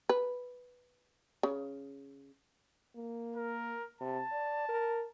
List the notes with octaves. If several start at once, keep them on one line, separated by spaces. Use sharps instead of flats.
B4
C#3
A#3
A#4
C3 A5
D5
A#4